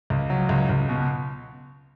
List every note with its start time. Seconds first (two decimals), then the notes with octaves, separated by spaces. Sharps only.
0.10 C#2
0.30 F#3
0.49 C#2
0.69 C#2
0.89 B2